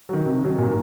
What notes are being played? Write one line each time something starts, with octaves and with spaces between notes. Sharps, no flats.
D#3 F#3
C3
D#3 F#3
A#2
A#4